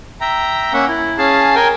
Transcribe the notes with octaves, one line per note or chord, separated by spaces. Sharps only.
E5 G5 A#5
A#3 C#4 E5 F#5
E4
C#4 G#4 F5 A5
A#4 G5 G#5